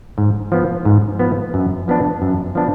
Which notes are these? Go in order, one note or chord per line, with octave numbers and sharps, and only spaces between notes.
G#2
F3 B3
G#2
F3 B3
F#2
F3 B3 D4
F#2
F3 B3 D4